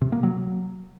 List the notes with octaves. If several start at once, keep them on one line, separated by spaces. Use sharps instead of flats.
C3
A#3
F#3